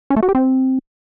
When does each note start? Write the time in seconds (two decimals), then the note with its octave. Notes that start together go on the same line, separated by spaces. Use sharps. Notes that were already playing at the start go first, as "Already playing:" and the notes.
0.10 C#4
0.17 A3
0.23 F#4
0.29 G4
0.35 C4